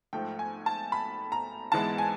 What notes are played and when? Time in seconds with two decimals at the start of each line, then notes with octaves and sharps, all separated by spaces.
0.13 G#2 F3 A3 G5
0.39 G#5
0.66 A5
0.92 B5
1.32 A#5
1.72 G#2 E3 G#3 B3 A5
1.98 G#5